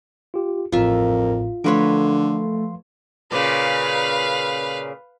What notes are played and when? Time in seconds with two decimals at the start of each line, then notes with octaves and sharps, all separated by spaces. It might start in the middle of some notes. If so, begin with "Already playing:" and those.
0.34 F4 G4
0.72 A1 F2 A2 F4 A#4 E5
1.64 D3 F3 A3 A#4 B4 C#5 F5 C6
3.32 A#2 C#3 B4 F5